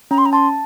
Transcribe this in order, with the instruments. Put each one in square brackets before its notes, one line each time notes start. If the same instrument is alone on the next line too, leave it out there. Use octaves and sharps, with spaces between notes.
[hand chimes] C#4 [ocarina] A#5
[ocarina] C6
A#5
[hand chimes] A5 [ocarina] C6